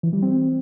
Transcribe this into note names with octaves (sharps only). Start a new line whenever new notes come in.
E3
G3
C4